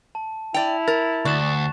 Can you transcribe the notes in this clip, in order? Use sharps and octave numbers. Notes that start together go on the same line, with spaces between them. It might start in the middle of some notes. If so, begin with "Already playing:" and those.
A5
E4 D5 G5 A5 F7
A#4 A6
D2 D5 C#6 F#6 E7